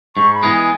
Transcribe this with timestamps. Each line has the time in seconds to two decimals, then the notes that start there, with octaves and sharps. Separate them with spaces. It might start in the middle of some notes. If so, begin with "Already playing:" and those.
0.16 G#2 C#6
0.34 B5
0.43 E3 G#3 B3
0.53 G#5